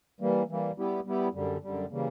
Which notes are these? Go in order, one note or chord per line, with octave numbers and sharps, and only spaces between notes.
E3 G3 A#3
E3 G3 A#3
G3 B3 E4 G4
G3 B3 E4 G4
F#2 D3 G3
F#2 D3 G3
C#3 E3 G3 A#3